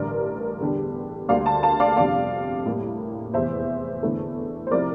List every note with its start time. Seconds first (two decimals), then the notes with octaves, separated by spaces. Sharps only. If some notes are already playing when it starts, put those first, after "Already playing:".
Already playing: A1 G2 D3 A#4 D5
0.60 E2 D3 G3 D4
1.29 D2 D3 G3 A#3 D5 F5
1.46 F5 A5
1.63 F5 A5
1.80 D5 F5
1.97 G1 F2 C3 G3 D4 D5 F5
2.66 A2 G3 A#3
3.34 F1 E2 E3 C5 E5
4.02 E2 D3 A3 E4
4.67 C5
4.71 C3 F3 C4 E4 A#4 D5